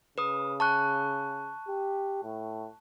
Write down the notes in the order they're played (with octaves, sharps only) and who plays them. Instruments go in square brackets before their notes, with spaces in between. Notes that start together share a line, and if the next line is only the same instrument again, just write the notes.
[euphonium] C#3 [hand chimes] B4 D#6
[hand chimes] A5 C#6 F#6
[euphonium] G4
A2